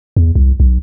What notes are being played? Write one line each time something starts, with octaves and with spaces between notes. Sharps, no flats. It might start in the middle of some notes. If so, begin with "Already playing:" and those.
E2
C2
B1